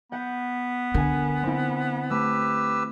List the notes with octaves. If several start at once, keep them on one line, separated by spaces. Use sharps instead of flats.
B3 F#5 G6
D3 A#4 G#5
C4 E4
A3 G4 B4 E6